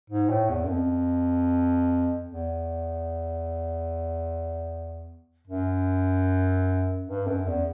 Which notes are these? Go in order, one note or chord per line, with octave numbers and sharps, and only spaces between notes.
G#2
A2
E2
F#2
F2
E2
F#2
G2
F#2
E2